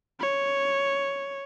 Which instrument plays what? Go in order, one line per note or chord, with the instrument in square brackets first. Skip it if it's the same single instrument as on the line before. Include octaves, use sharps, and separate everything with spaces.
[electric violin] C#5